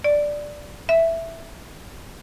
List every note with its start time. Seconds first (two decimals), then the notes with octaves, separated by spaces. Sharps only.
0.04 D5
0.89 E5